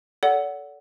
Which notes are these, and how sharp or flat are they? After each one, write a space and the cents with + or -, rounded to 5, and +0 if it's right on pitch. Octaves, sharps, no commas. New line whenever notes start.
A4 -5 D5 -45 F#5 +0